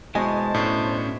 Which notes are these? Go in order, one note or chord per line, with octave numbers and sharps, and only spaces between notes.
B2 G#3 E4 C5 D#5 G#5 A5 C#6
A2 C#4 D4